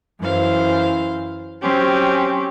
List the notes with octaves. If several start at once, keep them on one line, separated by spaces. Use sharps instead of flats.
F#2 E3 C5 F5
F#3 C4 C#4 G4